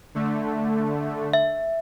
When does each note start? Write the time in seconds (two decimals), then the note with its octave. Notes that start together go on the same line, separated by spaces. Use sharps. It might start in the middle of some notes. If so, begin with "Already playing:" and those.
0.15 D3 A3
1.33 E5